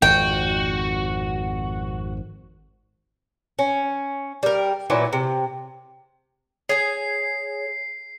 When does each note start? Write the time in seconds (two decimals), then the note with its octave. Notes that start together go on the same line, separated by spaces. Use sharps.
0.02 G#1 F2 F#4 G5
3.59 C#4
4.43 G3 A#4
4.90 A#2 E3 F#3 B3
5.13 C3
6.69 G#4 C#5 G#5 C7